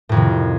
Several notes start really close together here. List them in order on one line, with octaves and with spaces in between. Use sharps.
A2 F2 D#3 C3